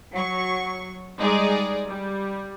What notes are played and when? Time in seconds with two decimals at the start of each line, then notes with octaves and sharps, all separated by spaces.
0.11 F#3 C#6
1.18 G3 G#3 D#4 G#4 D5
1.88 G3